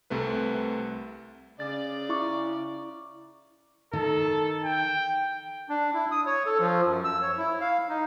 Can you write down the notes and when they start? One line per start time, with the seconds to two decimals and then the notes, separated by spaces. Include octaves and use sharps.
0.10 C2 C3 A3 B4
1.60 C#3 D5 A6
2.09 E4 C#6 D6
3.93 D#3 A4
4.65 G5
5.69 D4
5.94 E4
6.11 D#6
6.26 C#5
6.46 A4
6.59 F3
6.86 F#2
7.04 E6
7.22 C#5
7.37 E4
7.61 F5
7.89 D#4